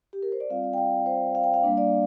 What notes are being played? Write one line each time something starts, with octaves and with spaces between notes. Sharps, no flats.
G4
A#4
C5
D5
G3 C4 F4 F5
D5
G5
F5
C5
F5
G5
F5
G3 A#3 D4
D5